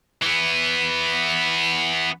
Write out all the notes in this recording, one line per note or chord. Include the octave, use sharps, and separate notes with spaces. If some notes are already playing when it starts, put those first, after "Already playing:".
E3 B3